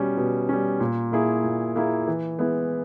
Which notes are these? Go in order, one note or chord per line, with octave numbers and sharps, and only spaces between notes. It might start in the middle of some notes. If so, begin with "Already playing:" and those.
Already playing: B2 G3 C#4
B2
G3 C#4
A#2
A#3 E4 G#4
A#2
A#3 E4 G#4
E3
G#3 B3 E4